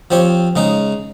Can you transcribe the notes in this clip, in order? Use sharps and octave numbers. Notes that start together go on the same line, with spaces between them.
F3 C4 G4 C#5
C#3 G#3 D#4